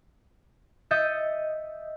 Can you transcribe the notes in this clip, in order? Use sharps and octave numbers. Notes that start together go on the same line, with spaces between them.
D#5 E5 D#6 G6 A6 C#7